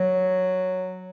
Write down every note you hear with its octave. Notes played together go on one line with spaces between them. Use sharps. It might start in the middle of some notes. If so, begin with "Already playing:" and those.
Already playing: F#3